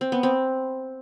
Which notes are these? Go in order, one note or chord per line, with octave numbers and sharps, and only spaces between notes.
C4
B3
C4